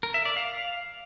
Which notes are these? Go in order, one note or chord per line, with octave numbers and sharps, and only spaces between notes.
A#4
E5
D5
F5